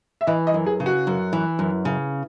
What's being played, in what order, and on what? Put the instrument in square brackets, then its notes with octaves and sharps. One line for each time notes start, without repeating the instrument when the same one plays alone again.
[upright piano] E5
[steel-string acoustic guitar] E3 [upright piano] D#5
[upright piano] D#5
[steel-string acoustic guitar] F#2
[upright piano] G#4
[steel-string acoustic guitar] C#3
[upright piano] F#4
[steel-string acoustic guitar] F#2
E3
F#2
C#3